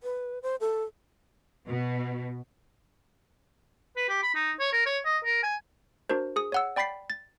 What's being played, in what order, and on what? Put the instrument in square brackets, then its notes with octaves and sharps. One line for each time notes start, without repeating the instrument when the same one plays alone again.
[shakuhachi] B4
C5
A4
[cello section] B2
[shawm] B4
G4
B5
D#4
C#5
A#4
C#5
D#5
A#4
G#5
[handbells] D4 F#4 A#4 C5
G#4 D#6
C#5 F#5 E6
D5 G5 B5 A6 B6 C7
A6